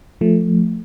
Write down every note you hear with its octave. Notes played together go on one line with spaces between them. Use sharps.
F3 A3